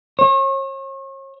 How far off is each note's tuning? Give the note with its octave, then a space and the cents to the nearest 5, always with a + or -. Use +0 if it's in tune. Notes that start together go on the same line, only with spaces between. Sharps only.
C#5 -40